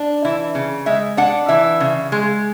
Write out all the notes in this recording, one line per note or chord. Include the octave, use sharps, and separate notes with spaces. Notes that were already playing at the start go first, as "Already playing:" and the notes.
Already playing: D4
E3 E4
C#3
G#3 E5
D4 F#5
E3 E5
C#3
G#3